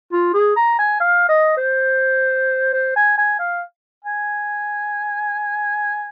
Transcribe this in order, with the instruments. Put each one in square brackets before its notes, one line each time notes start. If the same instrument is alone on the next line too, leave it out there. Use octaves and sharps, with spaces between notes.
[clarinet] F4
G#4
A#5
G#5
F5
D#5
C5
C5
G#5
G#5
F5
G#5